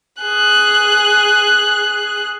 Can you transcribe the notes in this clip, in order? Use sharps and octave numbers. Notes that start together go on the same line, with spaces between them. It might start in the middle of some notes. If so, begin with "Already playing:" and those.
G#4 F#6